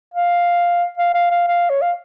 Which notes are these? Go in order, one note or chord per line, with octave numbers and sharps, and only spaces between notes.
F5
F5
F5
F5
F5
C#5
F5